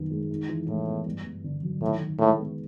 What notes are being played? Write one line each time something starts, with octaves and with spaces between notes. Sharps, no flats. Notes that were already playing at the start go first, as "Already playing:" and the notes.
Already playing: F#2 D#3 G3 B3
G#3
D#4
E3
A2 G#3
B3
G2
G2
D3
F#3
A2 D#3
D#3
A2 G#3
B3